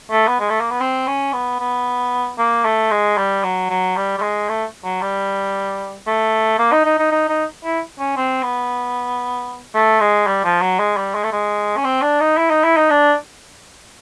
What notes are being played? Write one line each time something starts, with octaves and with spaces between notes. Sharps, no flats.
A3
B3
G#3
A3
A#3
B3
C4
C#4
B3
B3
A#3
A3
G#3
G3
F#3
F#3
G3
G3
G#3
A3
F#3
G3
A3
A#3
D#4
D#4
D#4
D#4
D#4
E4
C#4
C4
B3
A3
G#3
G3
F3
F#3
G#3
G3
G#3
A3
G#3
C#4
C4
D4
D#4
E4
D#4
E4
D#4
D4